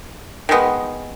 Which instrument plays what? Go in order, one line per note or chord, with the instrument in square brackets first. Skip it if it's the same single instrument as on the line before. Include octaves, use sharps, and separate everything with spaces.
[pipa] D#3 G#3 B3